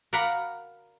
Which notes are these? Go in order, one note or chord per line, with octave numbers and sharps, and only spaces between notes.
A#4 D5 F5 F#5 A#5 B5